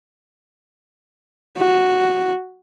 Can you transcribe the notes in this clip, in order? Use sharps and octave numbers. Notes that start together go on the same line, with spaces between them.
F#4